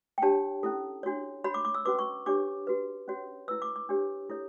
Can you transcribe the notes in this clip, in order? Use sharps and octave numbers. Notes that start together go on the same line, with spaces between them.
G5
D4 G4 C#5 A5
C#4 E4 A4
D4 F#4 C#5
F#4 C#5 B5
D6
D6
E6
C#4 F#4 B4 D6
C#6
D4 G4 C#5 D6
F#4 B4
C#4 F#4 C#5
E4 B4 E6
D6
D6
D4 G4 C#5
E4 A4 C#5